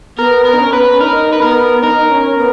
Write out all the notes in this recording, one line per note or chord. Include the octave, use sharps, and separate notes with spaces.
B3 A#4
A#4
D#4
C#4
B3 B4
C#4
D#4 A#4
B4
B3 A#4
D#4 A#4
C#4
B3